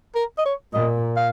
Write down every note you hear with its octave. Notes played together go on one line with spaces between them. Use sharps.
A#4
D#5
C#5
A#2 D#5
F5